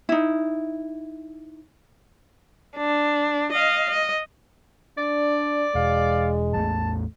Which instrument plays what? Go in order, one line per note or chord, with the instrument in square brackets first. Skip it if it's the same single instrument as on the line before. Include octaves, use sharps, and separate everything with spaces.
[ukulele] D#4 E4
[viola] D4
D#5 F5
D#5
[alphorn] D4 [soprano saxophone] D5
[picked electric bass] E1 [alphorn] G#3 [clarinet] F5
[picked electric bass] A1 E2 A3 [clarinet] A5